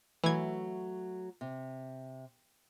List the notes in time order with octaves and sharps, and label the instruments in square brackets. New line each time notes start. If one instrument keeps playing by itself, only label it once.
[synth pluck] E3 G#6 [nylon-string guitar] F#3 A3
[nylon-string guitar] C3